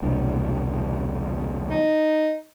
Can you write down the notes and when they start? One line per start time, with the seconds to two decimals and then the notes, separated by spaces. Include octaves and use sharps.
0.02 E1 C2 D4
1.71 D#4